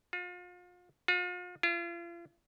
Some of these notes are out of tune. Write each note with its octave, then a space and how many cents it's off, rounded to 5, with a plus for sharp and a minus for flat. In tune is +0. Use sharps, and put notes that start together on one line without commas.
F4 +35
F4 +40
F4 -40